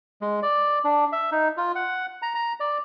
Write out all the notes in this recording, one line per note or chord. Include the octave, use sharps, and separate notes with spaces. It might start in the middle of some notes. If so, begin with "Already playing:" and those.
G#3
D5
D4
E5
D#4
F4
F#5
A#5
A#5
D5